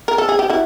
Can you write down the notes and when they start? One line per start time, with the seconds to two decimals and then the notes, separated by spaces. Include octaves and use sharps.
0.08 A#4
0.18 A4
0.29 G#4
0.39 G4
0.50 E4 F#4